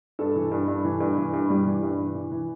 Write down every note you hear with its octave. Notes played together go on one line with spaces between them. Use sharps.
G2 A4
E3
G2
G2
E3
G2
E3
G2
G3
E3
G2
E3
E3
E3